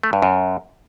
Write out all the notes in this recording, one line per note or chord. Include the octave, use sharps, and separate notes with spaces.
A3
G2
F#2